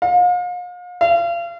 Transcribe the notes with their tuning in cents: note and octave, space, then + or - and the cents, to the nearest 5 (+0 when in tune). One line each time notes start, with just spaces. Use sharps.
F5 +40
F5 -35